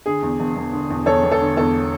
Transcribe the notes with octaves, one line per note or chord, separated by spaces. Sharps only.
D3 G#4
E2
E1
E1
D3
E2
E1 A4 C#5
E1
A4
D3
E2 A4